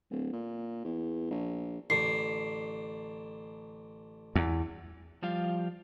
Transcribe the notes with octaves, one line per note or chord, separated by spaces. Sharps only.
D1
A#2
E2
A#1
A1 D3 C7
E2
F3 G3 F4 G4 F5